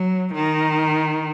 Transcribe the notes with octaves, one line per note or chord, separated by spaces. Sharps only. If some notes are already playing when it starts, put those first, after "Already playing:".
Already playing: F#3
D#3